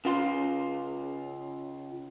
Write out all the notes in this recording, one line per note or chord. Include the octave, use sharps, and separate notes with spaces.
C#3 F4 C6